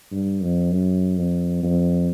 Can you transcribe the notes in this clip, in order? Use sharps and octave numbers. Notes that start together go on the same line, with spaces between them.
G2
F2
F#2
F2
F2